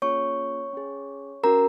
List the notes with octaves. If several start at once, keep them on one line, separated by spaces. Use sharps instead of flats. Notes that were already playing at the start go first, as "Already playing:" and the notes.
A#3 C#4 F4 G#4 C#5 C#6
C#4 G#4
C#4 F#4 A#4 A#5